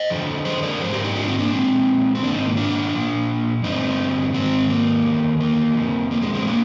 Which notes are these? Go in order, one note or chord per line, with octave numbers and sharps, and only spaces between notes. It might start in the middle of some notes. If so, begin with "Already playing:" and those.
Already playing: C5 D#5
F2 D3 F3
G#4 C5
A#4 D5
G#2 F3 G#4 C5
G4 A#4
D#4 G4
D4 F4
C4 D#4
A#3 D4
A#2 F3 G#3 C4
C4
G#2 D#3 A#3 D4
C4 D#4
A#3
D4 F4
A#2 F3
G2 D3 F3 C4 D#4
G#2 D#3 G#3 C4
A#3
F2 D#3
A#3
F2 C3 F3
A#3
G#3
G#3 C4
F3 A#3 D4